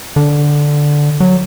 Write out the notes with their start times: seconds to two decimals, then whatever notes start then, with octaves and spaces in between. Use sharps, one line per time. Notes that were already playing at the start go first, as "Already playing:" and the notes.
0.16 D3
1.20 F#3